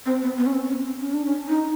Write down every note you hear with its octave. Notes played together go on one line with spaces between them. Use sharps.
C4
B3
B3
C#4
C4
C#4
C4
C#4
D4
C#4
D#4